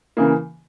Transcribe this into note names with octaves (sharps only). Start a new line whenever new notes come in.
C#3 E3 A#3